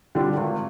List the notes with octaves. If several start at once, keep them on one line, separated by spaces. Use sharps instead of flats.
D3 G3 D4 F4
G#1